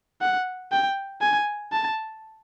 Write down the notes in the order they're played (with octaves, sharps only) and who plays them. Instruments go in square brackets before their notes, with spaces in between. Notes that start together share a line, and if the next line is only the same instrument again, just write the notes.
[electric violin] F#5
G5
G#5
A5